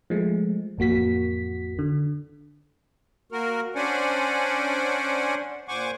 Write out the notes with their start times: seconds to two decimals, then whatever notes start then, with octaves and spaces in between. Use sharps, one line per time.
0.10 F3 G#3 A3
0.78 A1 F2 A#3 F#4 B6
1.79 D3
3.31 A#3 F#4 A#4
3.75 C#4 D4 C5 D5 F#5 G#5
5.68 A#2 C5 F#5 G#5 C#6 D6